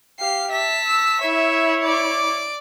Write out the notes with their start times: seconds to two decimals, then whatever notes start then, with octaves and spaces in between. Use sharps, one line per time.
0.20 G4 F5 C7
0.52 E5 A5 B6
0.85 E6
1.21 E4 C#5 E5
1.84 D5 D6